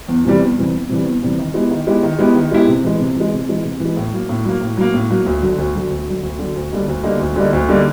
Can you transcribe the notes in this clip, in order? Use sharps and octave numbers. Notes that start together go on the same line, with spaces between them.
E2
C3 E3 G3
E2
C3 E3 G3
E2
C3 E3 G3
E2
C3 E3 G3
D#3
G#3 B3 E4 G4
D#3
G#3 B3 E4 G4
D#3
G#3 B3 E4 G4
D#3
G#3 B3 E4 G4
C3
E3 G#3
C3
E3 G#3
C3
E3 G#3
C3
E3 G#3
A2
F#3 A#3
A2
F#3 A#3
A2
F#3 A#3
A2
F#3 A#3
D2
D3 F#3
D2
D3 F#3
D2
D3 F#3
D2
D3 F#3
D2
D3 G3 A#3 D#4
D2
D3 G3 A#3 D#4
D2
D3 G3 A#3 D#4
D2
D3 G3 A#3 D#4